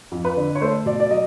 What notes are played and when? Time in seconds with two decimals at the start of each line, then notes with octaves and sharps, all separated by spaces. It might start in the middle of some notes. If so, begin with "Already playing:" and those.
0.12 F2
0.25 B4
0.37 D3
0.55 C#5
0.61 A3 C5
0.86 B2 D5
1.00 D5
1.11 F#3 D#5